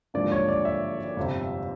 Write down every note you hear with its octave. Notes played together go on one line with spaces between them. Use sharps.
G#1 G2 D3 F3 A#3 D5
C#5
D5
E5
G1 F2 C3